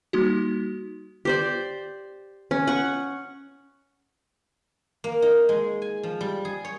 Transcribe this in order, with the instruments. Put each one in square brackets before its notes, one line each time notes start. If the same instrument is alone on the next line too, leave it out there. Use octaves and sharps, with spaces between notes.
[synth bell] G3 A#3 D#4 F#4
[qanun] G4 C5 D5
C#4
F#5 C#6
[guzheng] A#3
D#4
G#3
G#5
F3
G3
G#4
C#5